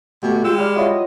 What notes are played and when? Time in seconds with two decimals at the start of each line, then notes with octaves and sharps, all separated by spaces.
0.23 B2 A3 F#4 G4
0.44 G#3 F4 G5 E6
0.58 G3 G4 F6
0.76 F#3 E4 F4 D#5